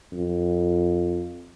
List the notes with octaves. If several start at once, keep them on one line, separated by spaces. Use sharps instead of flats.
F2